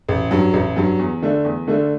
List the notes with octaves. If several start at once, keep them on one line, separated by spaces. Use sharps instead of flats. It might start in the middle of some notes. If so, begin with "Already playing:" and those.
A1
G2 F#3
A1
G2 F#3
E2
D3 A3 D4
E2
D3 A3 D4